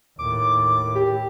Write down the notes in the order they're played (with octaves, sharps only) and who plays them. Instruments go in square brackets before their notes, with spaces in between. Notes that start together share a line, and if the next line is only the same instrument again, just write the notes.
[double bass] D#2 A2 [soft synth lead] D6
[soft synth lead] G4